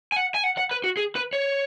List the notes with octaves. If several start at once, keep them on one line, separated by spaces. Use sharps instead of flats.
G#5
F#5
G#5
F#5
F#5
B4
F#4
G#4
B4
C#5